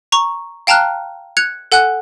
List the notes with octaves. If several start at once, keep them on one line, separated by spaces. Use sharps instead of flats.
A#5 C#6
F5 G5 A5 A#5 F6 F#6
F#6 G#6 C#7 F7
A4 F#5 G#5 F#6